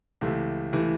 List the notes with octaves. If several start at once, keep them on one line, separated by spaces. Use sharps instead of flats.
C#2 C3 E3 A3
C3 E3 A3